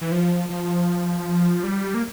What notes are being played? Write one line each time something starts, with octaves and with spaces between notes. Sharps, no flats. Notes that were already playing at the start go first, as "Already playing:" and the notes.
E3
F3
F3
G3
A#3